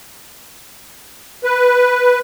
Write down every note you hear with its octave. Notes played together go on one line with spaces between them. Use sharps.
B4